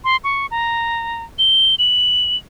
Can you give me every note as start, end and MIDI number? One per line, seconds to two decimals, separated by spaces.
0.04 0.17 84
0.24 0.46 85
0.51 1.23 82
1.39 1.75 103
1.79 2.37 102